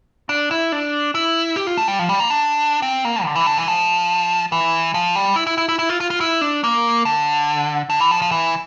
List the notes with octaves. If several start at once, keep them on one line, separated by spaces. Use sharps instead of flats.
D4
E4
D4
E4
G4
F4
A3
G3
F3
G3
A#3
D4
C4
A#3
D3
E3
D3
E3
F3
E3
F3
G3
E4
E4
E4
E4
E4
F4
F4
F4
E4
D4
A#3
D3
D3
E3
F3
F3
E3